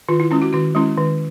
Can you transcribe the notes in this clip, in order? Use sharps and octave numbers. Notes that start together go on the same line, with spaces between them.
D#3 F4
E4
G#3 C#4 E4
F#4
D#3 F#4
G#3 C#4 E4
D#3